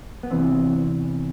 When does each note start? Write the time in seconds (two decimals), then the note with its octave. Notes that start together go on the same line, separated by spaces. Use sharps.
0.23 B3
0.30 E2 C3 E3 C4